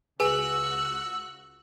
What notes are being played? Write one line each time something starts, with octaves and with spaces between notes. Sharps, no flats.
C#2 F#4 G#4 B4 G#5 E6 F#6